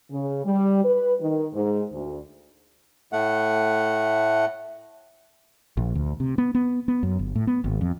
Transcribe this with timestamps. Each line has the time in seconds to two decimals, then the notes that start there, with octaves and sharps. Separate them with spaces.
0.11 C#3
0.45 G3
0.85 B4
1.21 D#3
1.54 G#2
1.93 D2
3.13 A2 A3 F#5
5.77 A#1
5.95 D2
6.20 C3
6.38 B3
6.55 B3
6.88 B3
7.03 F#2
7.19 G1
7.35 A2
7.47 B3
7.64 G#1
7.81 F2